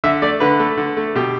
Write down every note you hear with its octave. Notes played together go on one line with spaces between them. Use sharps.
D3 E5
A3 D5
D3 B4
A3
D3
A3
B2 G4